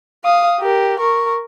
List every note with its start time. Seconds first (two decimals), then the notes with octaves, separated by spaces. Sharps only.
0.25 F5 D#6
0.60 G4 A#4
1.00 A#4 C#6